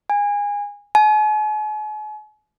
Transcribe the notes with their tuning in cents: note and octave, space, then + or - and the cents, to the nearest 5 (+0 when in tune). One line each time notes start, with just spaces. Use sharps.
G#5 -20
G#5 +45